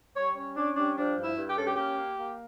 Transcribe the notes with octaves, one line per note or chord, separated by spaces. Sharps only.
G3 C#5
C#4 C#5
C#4 D4
G3 D4
F3 D4
G2
E4
G2
G4
C#4 A4
G4
A#3 G4
A#3
A#3